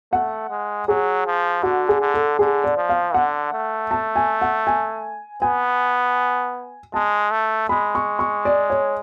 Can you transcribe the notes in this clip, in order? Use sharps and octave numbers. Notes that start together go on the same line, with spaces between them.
A3 F#5
G#3
F#3 G#4
F3
D3 F#4
G#4
D3
A4
D3 G#4
D5
F3
F5
D3 F#5
A3
A5
G#5
F#5
G#5
B3 G#5
G#3 A5
A3
G#3 B5
C#6
C#6
D5
C#5